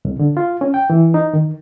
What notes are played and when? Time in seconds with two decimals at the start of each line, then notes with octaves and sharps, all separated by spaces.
0.05 C2
0.19 D3
0.37 F4
0.61 C#4
0.74 G5
0.90 E3
1.14 D#4
1.34 D#3